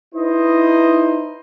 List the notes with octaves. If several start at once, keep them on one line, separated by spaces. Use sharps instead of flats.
D#4 E4 B4 C5 D#5